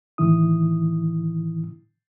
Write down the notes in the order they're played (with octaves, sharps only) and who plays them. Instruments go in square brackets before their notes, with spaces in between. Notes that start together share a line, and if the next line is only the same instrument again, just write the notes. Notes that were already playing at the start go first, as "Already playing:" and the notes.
[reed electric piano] A2 D#3 E3 E4 D#6